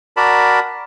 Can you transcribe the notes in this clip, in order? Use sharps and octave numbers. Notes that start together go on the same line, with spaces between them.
F#4 A#4 D5 A5 B5